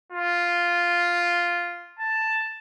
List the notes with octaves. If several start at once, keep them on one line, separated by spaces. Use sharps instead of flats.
F4
A5